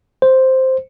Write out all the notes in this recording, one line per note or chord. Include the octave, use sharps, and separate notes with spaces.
C5